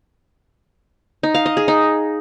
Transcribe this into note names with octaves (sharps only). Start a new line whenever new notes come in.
D#4
F5
D#5
G#4
D#4